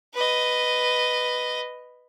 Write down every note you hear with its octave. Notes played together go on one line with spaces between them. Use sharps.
B4 D#5